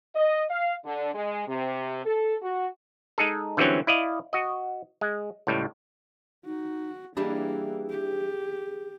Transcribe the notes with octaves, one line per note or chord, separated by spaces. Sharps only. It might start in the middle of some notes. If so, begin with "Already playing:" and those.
D#5
F5
D3
G#3
C3
A4
F#4
G#3 D#4 G#4 A4
D3 E3 F#3 G3 C4 C#4
E4 D5 D#5 F5
F#4 D#5
G#3
C#2 A2 G3
D#4 F#4
E3 G3 A#3 D4 G#4
G4